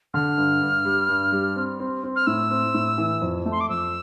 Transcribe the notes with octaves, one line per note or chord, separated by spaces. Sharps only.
D3 F6
G2
G2
G3
G2
G3
C4
C4
C4
F6
A2 E6
C4
A2
E3
F2
A3
C6
D6
F2 E6